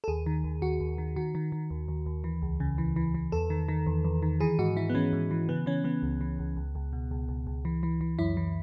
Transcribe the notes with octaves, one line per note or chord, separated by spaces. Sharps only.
A4
D#2 G#4
D#3
D#2
D#2 F#4
D#2
D#3
D#3 F#4
D#3
D#3
D#2
D#2
D#2
E3
C#2
C#3
E3
E3
E3
E2 A4
D#3
D#3
E2
E2
D#3
E3 G#4
G#2 F#4
E3 E4
B3
E3 C#4
G#2
E3
C#3 B3
E3 C#4
E3 B3
C#2
E3
C#2
C#2
C#2
B2
C#2
C#2
C#2
E3
E3
E3
F#2 E4
E3